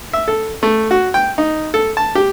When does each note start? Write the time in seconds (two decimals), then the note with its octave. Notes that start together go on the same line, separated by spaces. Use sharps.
0.13 E5
0.28 A4
0.63 A3
0.91 F#4
1.14 G5
1.38 D#4
1.74 A4
1.97 A5
2.15 G4